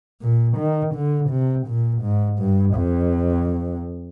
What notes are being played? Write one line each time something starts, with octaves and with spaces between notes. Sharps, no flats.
A#2
D#3
D3
C3
A#2
G#2
G2
F2